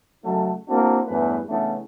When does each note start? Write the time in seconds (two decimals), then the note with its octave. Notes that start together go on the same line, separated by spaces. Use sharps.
0.23 C#3 F#3 A3 D#4 F#4 A4
0.68 A#3 C4 D4 E4 F#4
1.07 E2 G2 A3 C#4 B4
1.49 C#3 E3 A3 B3 C#4 D4